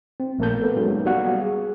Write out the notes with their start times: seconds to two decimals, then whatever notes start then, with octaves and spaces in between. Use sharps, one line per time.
0.20 C4
0.39 A#1 A3 A#3 A#4 A5 G6
0.60 B3 A4 B4
0.76 F#3 G#3 A#3 C#4 D#4 F#4
1.05 G3 B3 F#4 F5 F#5
1.41 G#4